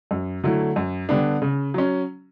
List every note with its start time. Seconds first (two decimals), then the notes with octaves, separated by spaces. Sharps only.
0.11 F#2
0.44 D3 F#3 A3 E4
0.76 F#2
1.09 D3 G3 B3 D4
1.42 C#3
1.74 F#3 C#4